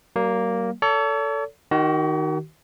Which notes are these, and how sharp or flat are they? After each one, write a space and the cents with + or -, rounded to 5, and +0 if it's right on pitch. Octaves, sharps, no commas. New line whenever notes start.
F#3 +45 A#3 +0
A4 +15 C#5 +45
D#3 +0 F#4 +40